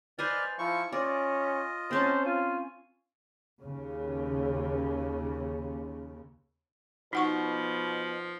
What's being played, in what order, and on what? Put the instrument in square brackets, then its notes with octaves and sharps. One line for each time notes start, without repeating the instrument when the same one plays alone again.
[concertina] B4 D5 F6 [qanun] C5 D#5 G#5
[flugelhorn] F3 [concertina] E4 C#6
[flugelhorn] C#4 [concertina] F4 D#5 [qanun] D5
[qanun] C4 C#4 A5 [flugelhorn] C5
[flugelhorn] F4 [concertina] G#5
[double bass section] D#2 C#3
[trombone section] B2 [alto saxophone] F3 [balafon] D#4 F#5 C#6